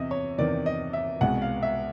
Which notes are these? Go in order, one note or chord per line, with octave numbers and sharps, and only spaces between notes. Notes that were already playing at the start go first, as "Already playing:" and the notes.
Already playing: E2 C3 D#5 E5
C#5
E2 C3 D#3 D5
D#5
E5
C2 B2 G#3 F#5
F5
E5